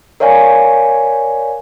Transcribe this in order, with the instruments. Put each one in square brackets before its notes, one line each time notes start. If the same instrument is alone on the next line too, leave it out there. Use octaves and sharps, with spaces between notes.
[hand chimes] A#4 C#5 D5 F5 G#5